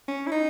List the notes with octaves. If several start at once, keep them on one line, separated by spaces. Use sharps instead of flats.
C#4
E4
D#4